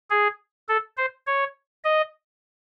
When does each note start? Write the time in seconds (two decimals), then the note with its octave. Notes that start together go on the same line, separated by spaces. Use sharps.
0.10 G#4
0.68 A4
0.97 C5
1.27 C#5
1.84 D#5